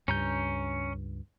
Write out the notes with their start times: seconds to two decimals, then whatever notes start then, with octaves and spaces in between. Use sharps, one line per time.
0.08 C#2 G2 C#4 A#5 G6